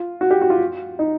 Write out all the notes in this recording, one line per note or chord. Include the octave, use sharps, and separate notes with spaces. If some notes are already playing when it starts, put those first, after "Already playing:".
Already playing: F4
F#4
G4
F#4
F4
D#4